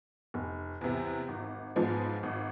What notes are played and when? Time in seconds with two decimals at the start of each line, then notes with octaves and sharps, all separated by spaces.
0.34 F1
0.81 E2 C3
1.28 G#1
1.76 G#2 F3 G#3 B3
2.23 G#1